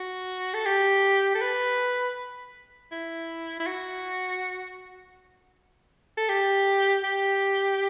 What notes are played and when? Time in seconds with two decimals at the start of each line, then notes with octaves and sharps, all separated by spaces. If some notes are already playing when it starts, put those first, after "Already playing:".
Already playing: F#4
0.54 A4
0.66 G4
1.34 A4
1.41 B4
2.92 E4
3.60 E4
3.66 F#4
6.17 A4
6.29 G4
7.04 G4